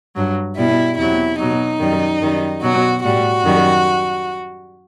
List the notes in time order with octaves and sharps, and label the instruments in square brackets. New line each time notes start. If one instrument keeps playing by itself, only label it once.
[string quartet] G2 F#3
B2 G3 E4
E2 C3 F#3 E4
B2 F#3 D#4
F#2 D#3 G3
F#2 D#3 G3
B2 F#3 F#4
A2 G3 F#4
F#2 D#3 G3